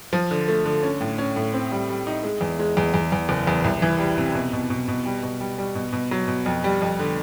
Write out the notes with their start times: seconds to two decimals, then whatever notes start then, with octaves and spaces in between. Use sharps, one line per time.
0.13 F3
0.31 D3
0.48 A3
0.65 D3
0.83 C#4
1.01 A2
1.18 C#4
1.36 A2
1.53 C4
1.72 G3
1.89 G3
2.07 D#4
2.23 G#3
2.41 E2
2.59 G#3
2.77 E2
2.94 E2
3.12 E2
3.29 F#1
3.47 E2
3.64 C2
3.82 E3
3.99 G3
4.18 C3
4.35 B2
4.53 B2
4.70 B2
4.88 B2
5.06 G3
5.23 B2
5.40 G3
5.58 G3
5.75 B2
5.93 B2
6.11 F#3
6.28 B2
6.46 F2
6.64 G3
6.82 F2
6.99 D3